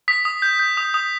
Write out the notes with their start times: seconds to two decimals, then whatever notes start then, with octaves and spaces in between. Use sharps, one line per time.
0.08 D#6 B6
0.25 D#6
0.42 G6
0.59 G6
0.77 D#6
0.94 D#6